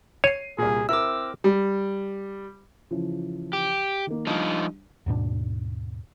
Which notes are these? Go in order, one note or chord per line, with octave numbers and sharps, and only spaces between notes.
C#5 C7 D#7
C2 A#2 G#4
C4 E4 A#4 D6 E6
G3
C#3 E3 F3
G4
D#3 A#3
F3 G3 D4 D#4
D#2 G#2 B2 D4